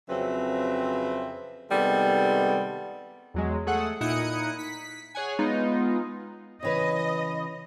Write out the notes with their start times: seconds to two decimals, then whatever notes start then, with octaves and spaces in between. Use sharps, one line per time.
0.09 F2 C#3 F#3 C4 B4 E5
1.71 C3 D#3 G3 G#3 B3 A4
3.34 E2 F#3 G#3
3.66 A3 G#4 A4 F#5
4.01 A#2 D#4 E4 D#6 F#6 C#7
4.59 B6
5.15 G#4 C#5 F#5 G#5
5.39 G#3 B3 D#4 F4
6.63 C#3 E3 B4 D#5